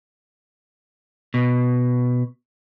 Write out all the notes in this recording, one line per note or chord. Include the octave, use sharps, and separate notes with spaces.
B2